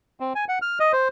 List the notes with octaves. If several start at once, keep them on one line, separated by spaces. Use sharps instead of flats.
C4
G#5
F#5
F6
D#5
C5